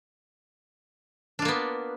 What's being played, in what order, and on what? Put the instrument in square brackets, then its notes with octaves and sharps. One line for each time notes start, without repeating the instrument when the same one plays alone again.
[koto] D4
F4
A#3
B3